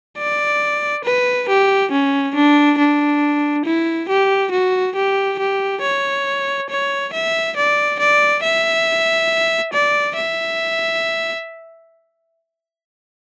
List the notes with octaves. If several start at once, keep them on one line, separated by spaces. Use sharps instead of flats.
D5
B4
G4
C#4
D4
D4
E4
G4
F#4
G4
G4
C#5
C#5
E5
D5
D5
E5
D5
E5